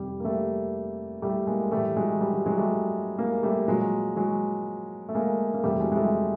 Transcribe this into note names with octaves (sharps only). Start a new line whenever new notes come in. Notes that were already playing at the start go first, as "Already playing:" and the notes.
Already playing: F2 C3 D#3 G3
A#3
G3 A3
G3 A3
G#3 A#3
A2 E3 G3 A3
F#3 G#3
G3
F#3
F#3 G#3
G3 A3
G#3 A#3
G3 A3
A#2 F3 F#3 G#3
F#3 G#3
A3
G#3 A#3
A#3
F2 C3 E3 G3 A3
F#3 G#3
G#3
G3 A3